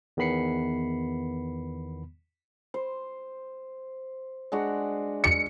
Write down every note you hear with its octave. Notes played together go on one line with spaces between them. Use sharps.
E2 D#3 B3 B5 C7 C#7
C5
G#3 D4 F#4
C#7